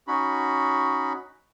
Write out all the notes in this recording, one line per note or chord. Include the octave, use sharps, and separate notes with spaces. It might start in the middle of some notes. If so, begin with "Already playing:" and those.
C#4 D#4 F#4 B5